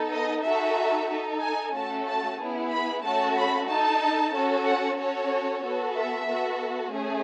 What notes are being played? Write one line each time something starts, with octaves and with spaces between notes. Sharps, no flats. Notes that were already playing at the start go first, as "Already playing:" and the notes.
Already playing: B3 D#4 A4
D#5
D#4 F#4 A4 E5
D#4 A4
G#5
A3 C#4 F#4 A4 A5
A5
B3 E4 G#4
B5
A3 C#4 F#4 A4 A5
B5
D#4 A4 A5
C#4 F#4 A4
F#5
C#4 F#4 A4 C#5
B3 F#4 A4
E5
B3 F#4 A4
A3 C#4 G#4